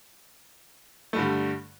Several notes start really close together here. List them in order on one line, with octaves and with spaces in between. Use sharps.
A3 G2 D3 G3